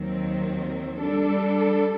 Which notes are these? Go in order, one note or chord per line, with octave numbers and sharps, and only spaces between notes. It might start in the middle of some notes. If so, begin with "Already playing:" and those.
Already playing: D#2 D#3 F#3 C4
G3 D4 A4